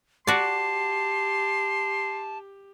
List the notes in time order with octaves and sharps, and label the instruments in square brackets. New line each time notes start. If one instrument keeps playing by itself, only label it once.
[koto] F#4 D5 [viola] G4 [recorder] A5 [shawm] C6